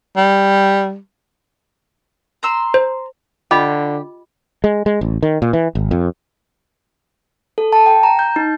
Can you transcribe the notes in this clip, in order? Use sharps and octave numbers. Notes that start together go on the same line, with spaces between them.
G3
A#5 C6 E6
C5
D3 F4 G4 D#5 B5
G#3
G#3
A1
D#3
A#2
E3
G#1
F2
A4
A5
G5
A#5
G6
D#4